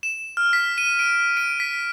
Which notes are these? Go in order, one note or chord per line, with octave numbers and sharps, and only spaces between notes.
E7
F6
B6
D#7
D7
D7
B6